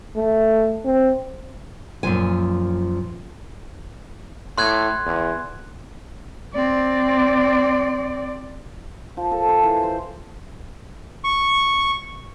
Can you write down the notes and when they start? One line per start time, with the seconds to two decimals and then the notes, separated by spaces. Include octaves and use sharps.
0.16 A3
0.85 C4
2.03 F#2 A#2 F3 G#5
4.58 A2 C6 F#6 G#6
5.06 E2
6.54 C4 D5
9.17 F3
9.32 A4
9.48 C5
9.63 E3
9.83 C5
11.24 C#6